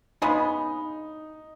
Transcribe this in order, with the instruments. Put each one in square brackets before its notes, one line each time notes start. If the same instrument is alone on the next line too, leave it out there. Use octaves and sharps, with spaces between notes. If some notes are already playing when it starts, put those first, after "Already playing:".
[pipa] C#3 G#3 B3 [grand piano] D#4